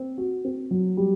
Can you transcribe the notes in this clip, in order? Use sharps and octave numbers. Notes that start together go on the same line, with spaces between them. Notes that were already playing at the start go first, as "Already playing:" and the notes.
Already playing: C4
F#4
C4
F#3
G3